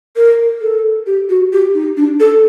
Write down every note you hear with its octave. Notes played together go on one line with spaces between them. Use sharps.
A#4
A4
G4
F#4
G4
D#4
D4
A4